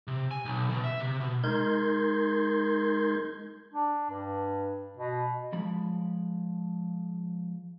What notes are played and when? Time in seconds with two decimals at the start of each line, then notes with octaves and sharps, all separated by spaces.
0.07 C3
0.31 G#5
0.45 B1
0.70 B2
0.84 E5
1.00 C3
1.20 B2
1.44 G#3 D#4 A#4 C6 G6 G#6
3.73 D4
4.10 G2
4.97 B2
5.53 F3 G#3 B5